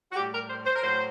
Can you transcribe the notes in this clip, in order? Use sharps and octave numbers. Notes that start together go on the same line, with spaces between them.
F#4
A2 G3 G4
A#4
C5
C5
A#4
A2 F#3 C5